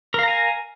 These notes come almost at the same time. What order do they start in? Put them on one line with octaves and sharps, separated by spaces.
A#4 F5 A#5 G#5